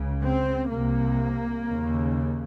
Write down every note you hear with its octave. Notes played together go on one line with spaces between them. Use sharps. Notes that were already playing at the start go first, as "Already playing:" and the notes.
Already playing: C#2 C#3
C4
C2 C3 A#3
D#2 C#3